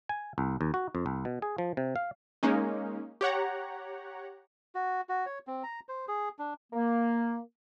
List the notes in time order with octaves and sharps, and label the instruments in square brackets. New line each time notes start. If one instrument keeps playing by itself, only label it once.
[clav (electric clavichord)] G#5
C2
D#2
F#4
F2
C2
B2
G#4
F3
C3
F5
[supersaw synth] G#3 A#3 C#4 D#4
G4 C#5 F#5 A#5
[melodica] F#4
F#4
C#5
C4
A#5
C5
G#4
D4
[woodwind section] A#3